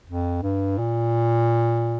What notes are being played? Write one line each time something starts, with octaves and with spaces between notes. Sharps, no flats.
F2
G2
A#2